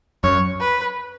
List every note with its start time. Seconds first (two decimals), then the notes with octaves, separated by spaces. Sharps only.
0.23 F#2 C#5
0.60 B4